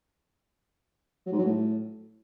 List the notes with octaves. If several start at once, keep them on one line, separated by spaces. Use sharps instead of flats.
F#3
G#2
F#3
A2